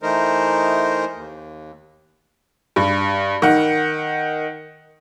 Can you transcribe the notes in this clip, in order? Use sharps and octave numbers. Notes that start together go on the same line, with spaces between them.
E3 A3 D#4 A#4 C5
D#2
G2
D#3 F#5